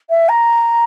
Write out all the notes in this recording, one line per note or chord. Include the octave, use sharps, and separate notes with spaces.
E5
A#5